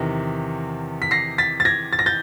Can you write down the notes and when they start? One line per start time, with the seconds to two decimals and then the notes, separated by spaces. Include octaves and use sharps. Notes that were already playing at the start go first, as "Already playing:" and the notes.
Already playing: E2 C3 D#3
1.02 B6
1.11 A#6 C7
1.38 A6 B6
1.60 A6
1.65 G#6 A#6
1.93 A6
1.99 A#6
2.06 G6 A6